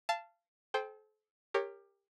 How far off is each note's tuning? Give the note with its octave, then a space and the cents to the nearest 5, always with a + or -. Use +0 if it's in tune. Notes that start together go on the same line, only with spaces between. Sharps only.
F5 -25 A5 +0
A4 -40 C5 +0 G5 +5
G4 +20 A#4 -10 C#5 +0